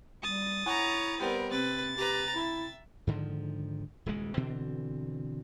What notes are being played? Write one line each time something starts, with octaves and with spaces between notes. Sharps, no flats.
G3 D#6 A6
E4 C#5 F#5 G#5 A#5 C#6
G3 B3 C4 G4 A#4
C3 C4 B4 A6
G4 B4 A#5
E4 E5
G#2 D3 D#3 F3
D#1 E2 C#3 G#3
B2 D3 E3 C4